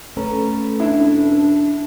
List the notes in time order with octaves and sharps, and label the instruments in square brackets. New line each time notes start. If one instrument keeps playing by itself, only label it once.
[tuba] A3 [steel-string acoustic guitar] C#4 A4 B4 [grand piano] A#5
[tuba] E1 [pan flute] D4 [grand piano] E4